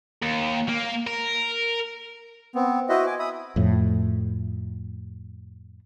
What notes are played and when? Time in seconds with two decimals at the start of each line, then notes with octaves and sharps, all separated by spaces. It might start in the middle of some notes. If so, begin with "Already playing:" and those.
0.23 D#2
0.69 A#3
1.07 A#4
2.55 B3 C4
2.89 E4 F#4 B4 C5 D#5 E5
3.06 G#5 D6
3.19 E5 B5 D#6
3.56 F2 A2